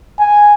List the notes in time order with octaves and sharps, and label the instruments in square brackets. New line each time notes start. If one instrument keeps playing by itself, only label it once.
[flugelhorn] G#5